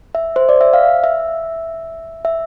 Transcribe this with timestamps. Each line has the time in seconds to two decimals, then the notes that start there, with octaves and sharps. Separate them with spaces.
0.15 E5
0.36 C5
0.49 D5
0.61 E5
0.73 F5
1.04 E5
2.25 E5